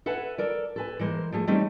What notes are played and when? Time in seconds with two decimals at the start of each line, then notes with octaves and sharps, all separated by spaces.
0.06 A4 B4 E5 F#5 G#5
0.38 A4 A#4 D5
0.76 A4 B4 G#5
0.99 E3 G#3 A#3 C5
1.32 F3 A3 G#4
1.47 E3 G3 A3 C4 C#4 D#4